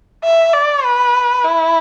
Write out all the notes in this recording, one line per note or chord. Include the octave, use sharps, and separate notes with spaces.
E5
D5
B4
E4